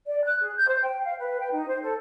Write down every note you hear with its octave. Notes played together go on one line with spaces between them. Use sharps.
D5
F#6
G#4
G6
C5
G5
F5
B4
G5
D#4
C5
A4